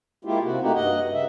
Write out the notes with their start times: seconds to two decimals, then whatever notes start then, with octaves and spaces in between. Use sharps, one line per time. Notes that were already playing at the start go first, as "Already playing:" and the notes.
0.25 G#3 A#3 E4 F4 G4
0.42 C3 F#4
0.61 A3 A#3 D#4 F#4 G4
0.74 G2 D#5 F#5
1.13 C#3 E5